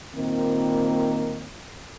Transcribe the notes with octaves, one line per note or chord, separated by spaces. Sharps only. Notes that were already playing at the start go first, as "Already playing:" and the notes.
A#2 D#3 A#3 C4